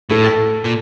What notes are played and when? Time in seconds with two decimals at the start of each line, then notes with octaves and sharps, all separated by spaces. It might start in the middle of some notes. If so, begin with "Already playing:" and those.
0.10 A2 A4
0.65 A#2